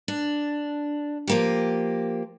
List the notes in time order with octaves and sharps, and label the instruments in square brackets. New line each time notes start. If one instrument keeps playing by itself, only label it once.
[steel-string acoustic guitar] D4
F3 A#3 G4